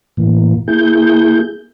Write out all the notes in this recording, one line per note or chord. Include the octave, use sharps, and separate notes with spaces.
A2 E3 A#3
A#3 E4 G#4 G6